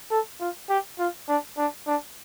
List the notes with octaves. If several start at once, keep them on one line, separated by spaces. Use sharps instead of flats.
A4
F4
G4
F4
D4
D4
D4